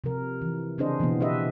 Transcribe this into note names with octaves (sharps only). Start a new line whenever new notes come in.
C3 F3 A#4
E3
C#3 C4 D4 G#4 C5 D#5
B2 E3 F3 A#3 B3
D4 G4 B4 D#5 E5